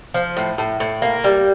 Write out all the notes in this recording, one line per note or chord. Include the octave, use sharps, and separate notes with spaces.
F3
A2
A2
A2
A#3
G3